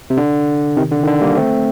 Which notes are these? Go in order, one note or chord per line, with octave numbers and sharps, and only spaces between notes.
C3
D3
C3 D#3
D3
D#3
D3
G3 A#3
A3 C4